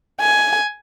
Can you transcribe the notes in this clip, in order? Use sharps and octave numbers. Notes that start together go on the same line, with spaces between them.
G#5